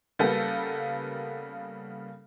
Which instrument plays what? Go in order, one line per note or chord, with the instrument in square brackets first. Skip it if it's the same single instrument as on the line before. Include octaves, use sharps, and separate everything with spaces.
[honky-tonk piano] C#3 G3 A#3 B3 A4